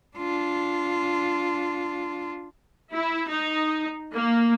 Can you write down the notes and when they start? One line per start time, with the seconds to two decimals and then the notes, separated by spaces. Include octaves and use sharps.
0.17 D4 F4
2.94 E4
3.29 D#4
4.14 A#3